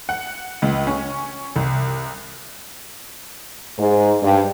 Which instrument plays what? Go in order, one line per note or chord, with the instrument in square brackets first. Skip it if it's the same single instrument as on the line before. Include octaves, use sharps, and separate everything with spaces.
[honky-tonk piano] F#5
C#2
C#4
C2
[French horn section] G#2
G2